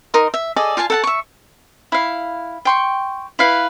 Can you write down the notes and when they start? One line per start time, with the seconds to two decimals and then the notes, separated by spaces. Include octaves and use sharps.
0.14 D#4 A#4 D#5 C6
0.34 E5
0.56 G#4 A4 D5 D#5
0.77 F4 F5 G#5 A5
0.90 A4 F#5 A5
1.04 E5 C#6
1.92 E4 F5
2.65 G5 C6 C#6
3.39 E4 B4 F5